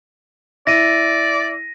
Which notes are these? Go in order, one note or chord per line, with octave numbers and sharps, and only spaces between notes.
E4 D5 A#6 D#7